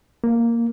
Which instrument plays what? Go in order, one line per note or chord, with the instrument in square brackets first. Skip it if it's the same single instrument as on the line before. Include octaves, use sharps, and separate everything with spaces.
[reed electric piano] A#3